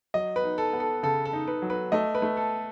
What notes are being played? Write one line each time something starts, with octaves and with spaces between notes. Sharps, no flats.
F#3 D#5
B4
D#4
A4
B3
A4
C#3 A4
A4
D#4
B4
F#3
B4
A3 D#5
B4
A3
A4